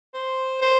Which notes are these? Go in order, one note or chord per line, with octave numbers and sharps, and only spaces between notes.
C5
C5